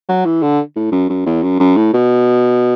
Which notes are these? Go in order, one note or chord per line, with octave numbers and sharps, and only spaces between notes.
F#3
E3
D3
A2
F#2
F#2
E2
F#2
F#2
A2
B2